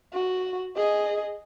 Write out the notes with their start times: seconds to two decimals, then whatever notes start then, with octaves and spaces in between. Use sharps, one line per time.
0.13 F#4
0.76 G#4 D#5